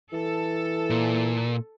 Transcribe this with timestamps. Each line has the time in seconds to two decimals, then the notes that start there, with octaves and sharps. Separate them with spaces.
0.12 E3 A4
0.90 A#2